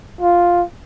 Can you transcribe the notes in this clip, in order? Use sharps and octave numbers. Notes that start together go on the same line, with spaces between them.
F4